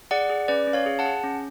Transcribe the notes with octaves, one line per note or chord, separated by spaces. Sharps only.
G#4 D5 F#5
G#4
C#4 B4 D5
C#4
C#5 F5
G#4
F#5 A5
G#4
C#4